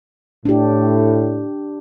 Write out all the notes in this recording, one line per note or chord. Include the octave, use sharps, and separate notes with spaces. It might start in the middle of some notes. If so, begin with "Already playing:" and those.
A2 D4 G4